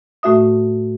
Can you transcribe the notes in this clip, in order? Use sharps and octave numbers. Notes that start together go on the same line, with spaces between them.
A2 A3 F#4 E5 D#6